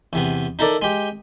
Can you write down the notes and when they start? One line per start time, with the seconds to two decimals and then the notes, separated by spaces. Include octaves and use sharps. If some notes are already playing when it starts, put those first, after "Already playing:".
0.13 E2 C3 B3
0.59 D#4 E4 A4 A#4 D5
0.82 G#3 G4